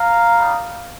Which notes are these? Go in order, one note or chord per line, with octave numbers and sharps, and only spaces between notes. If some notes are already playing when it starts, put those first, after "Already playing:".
Already playing: F5 A#5
G3 A#3 D#4